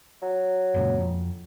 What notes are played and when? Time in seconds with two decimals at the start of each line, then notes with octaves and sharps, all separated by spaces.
0.22 F#3
0.74 F#1 C#2 A#2
0.99 F2